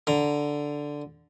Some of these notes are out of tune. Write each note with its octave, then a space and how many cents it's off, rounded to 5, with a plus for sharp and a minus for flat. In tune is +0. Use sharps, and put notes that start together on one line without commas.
D3 +0 A#5 +10